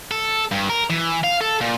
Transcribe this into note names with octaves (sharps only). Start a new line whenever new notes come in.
A4
G2
A#4
E3
F5
A4
A#2